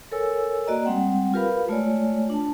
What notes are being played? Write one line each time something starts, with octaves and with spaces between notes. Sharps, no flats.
A4 A#4 C#5 G#5 E6
A#3 F#4 D5 D#5 A#5
G3 G#3 C4 F#5 G5
F4 G4 A#4 B4 F5 B5
G#3 A3 F4 C#5 D5 G#5
D4 A5